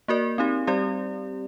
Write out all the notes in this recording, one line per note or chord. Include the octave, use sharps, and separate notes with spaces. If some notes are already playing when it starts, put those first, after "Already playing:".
A#3 F#4 A#4 D5
C4 D#4 G4
G3 C4 G4 D5